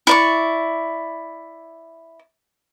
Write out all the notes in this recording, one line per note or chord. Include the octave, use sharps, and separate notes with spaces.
E4 D5 C#6